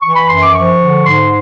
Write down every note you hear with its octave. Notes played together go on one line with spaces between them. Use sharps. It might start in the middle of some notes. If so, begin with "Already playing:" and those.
E3 C#6
B5
F#2 C6
D6
F3 C#6
D3
G#2 C6